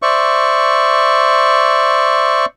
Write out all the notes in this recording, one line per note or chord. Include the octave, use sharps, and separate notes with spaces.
C5 D5 E5 C#6